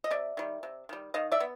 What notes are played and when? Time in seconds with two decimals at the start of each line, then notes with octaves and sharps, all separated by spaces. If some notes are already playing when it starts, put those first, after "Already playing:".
0.04 D#5
0.11 C3 D5 E5
0.37 D#3 G3
0.63 C3
0.89 D#3 G3
1.14 D#3 D#5 F5
1.32 D5 E5
1.40 B3